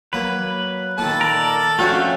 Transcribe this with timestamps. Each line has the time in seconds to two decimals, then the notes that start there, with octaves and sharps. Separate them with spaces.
0.13 F#3 A#3 B4
0.98 A#2 D#3 A4 A5
1.21 A#4 D5
1.79 F2 A3 C#4 D4 F#4 G4